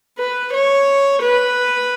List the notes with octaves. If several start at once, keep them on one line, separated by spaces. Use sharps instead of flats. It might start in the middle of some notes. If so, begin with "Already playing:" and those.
B4
C#5
B4